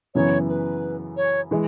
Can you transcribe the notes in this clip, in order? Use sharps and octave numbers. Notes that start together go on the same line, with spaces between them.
F#2 C#3 E3 B3 C#5
B4
C#5
E3 G#3